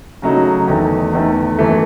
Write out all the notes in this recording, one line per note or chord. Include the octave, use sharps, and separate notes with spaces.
C#3 F#3 A3 D#4
E2 D#3 A3
E2 D#3 A3
F#2 E3 A3